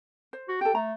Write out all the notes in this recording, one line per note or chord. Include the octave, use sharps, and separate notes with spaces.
C5
F#4
G4 A4 G5
A3 A#5